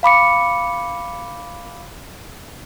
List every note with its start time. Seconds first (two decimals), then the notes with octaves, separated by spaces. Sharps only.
0.03 F5 B5 D6 C#7